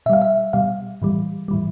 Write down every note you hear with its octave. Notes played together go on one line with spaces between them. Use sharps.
B2 G3 E5 F5
E5
B2 G3 F5
A2 E3 G3
A2 E3 G3